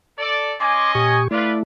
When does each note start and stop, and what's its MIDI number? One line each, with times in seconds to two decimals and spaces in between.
0.18 0.54 69
0.18 0.54 74
0.60 1.19 61
0.60 1.19 75
0.60 1.19 80
0.60 0.92 84
0.60 0.93 86
0.95 1.28 46
0.95 1.28 67
0.95 1.28 85
0.95 1.23 87
1.31 1.63 57
1.31 1.63 64
1.31 1.53 65
1.31 1.53 71
1.31 1.58 74